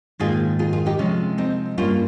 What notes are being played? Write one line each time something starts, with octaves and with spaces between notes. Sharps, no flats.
G#2 D#3 A#3 F4 G#4
F4 G#4
F4 G#4
D#4 G4
C3 F3 G#3 C#4
C4 D#4
G2 G3 A#3 C#4 F4